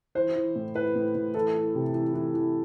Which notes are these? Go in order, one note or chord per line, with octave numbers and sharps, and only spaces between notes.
E3 C5
E3
A2
E3 B4
A2
A2
E3 A4
E3
C3
E3
E3
E3